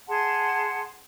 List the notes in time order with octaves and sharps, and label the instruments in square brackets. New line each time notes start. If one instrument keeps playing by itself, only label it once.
[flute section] G#4 F#5 A5 C6